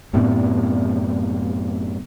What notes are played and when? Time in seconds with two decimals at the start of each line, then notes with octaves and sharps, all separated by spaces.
0.13 F#2 A2 C3 B3